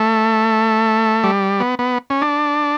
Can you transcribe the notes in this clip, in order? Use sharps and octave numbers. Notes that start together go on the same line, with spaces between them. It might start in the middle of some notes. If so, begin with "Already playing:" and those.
Already playing: A3
G3
B3
B3
C#4
D4